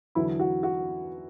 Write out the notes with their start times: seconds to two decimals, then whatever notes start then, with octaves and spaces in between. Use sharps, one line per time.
0.15 E2 D3 F#3 E4
0.39 F#4
0.63 F#4